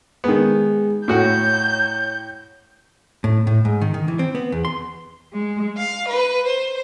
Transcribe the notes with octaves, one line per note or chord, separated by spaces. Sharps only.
D#3 G#3 B3 G#4
A2 F#4 C#5 F#5 G5 G6
A2
A2
G#2
D#3
D#3
E3
C4
B3
E2
C6
G#3
F5
B4
C5